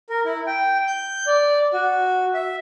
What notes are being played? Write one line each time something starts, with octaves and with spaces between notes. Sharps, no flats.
A#4
E4
G5
G6
D5
F#4
E5